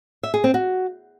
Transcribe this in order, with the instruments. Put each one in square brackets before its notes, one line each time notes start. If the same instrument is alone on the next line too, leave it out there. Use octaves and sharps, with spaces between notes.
[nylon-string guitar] E5
G#4
C4
F#4